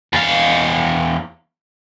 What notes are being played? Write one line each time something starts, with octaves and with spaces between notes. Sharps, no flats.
E2 F5